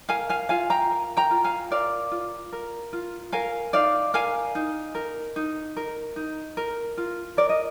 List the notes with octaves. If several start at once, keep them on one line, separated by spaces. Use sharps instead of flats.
A#4 F5 G#5
F5 G#5
F4 F5 G#5
G5 A#5
A#4
G5 A#5
F4
F5 G#5
A#4 D5 F5
F4
A#4
F4
A#4 F5 G#5
D#4 D5 F5
A#4 F5 G#5
D#4
A#4
D#4
A#4
D#4
A#4
F4
A#4 D5
D#5